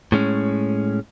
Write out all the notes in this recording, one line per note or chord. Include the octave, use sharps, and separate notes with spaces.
A2 G#3 C#4